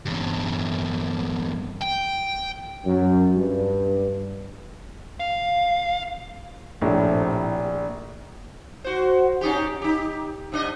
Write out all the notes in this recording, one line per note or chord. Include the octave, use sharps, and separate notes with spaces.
E2 G2
G5
F#2
G2
F5
A#1 A2 C3
F#4 C5
C#4 D#4 G4
D#4 G4
C3 D4 D#5